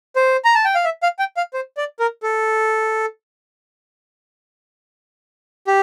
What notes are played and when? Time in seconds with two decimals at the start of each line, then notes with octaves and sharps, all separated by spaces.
0.16 C5
0.45 A#5
0.55 A5
0.65 G5
0.75 F5
0.84 E5
1.03 F5
1.19 G5
1.37 F5
1.54 C5
1.77 D5
2.00 A#4
2.23 A4
5.67 G4